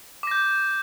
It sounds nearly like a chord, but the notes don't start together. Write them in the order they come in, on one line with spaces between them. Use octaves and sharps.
D6 A#6 G6